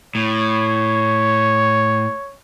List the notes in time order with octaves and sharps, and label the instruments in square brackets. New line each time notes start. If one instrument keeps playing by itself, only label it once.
[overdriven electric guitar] A2 [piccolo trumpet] C#5